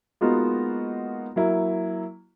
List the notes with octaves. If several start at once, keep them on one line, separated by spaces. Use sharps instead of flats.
G#3 A#3 B3 D#4 F4 F#4
F#3 A#3 E4